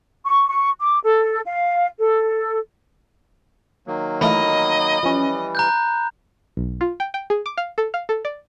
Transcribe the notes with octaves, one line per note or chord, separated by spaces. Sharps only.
C#6
C#6
D6
A4
F5
A4
D#3 F#3 A#3
E3 A3 F4 D#5 B5
E3 F3 G3 C#4
A#5 F#6 G6
B1
F4
G5
G5
G#4
D6
F5
A4
F5
A4
D5